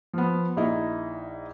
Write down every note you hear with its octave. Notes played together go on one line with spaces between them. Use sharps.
F3 B3
A#1 D#4 E4 D#5